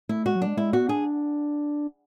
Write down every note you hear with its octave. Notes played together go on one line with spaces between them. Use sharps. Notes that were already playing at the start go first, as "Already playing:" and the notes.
A3 E4
G#3 F#4
F#3
D4
G#3
G#3 E4
B3 F#4
D4 G#4